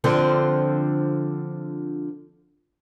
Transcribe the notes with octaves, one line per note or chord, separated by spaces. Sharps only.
D3 F3 C4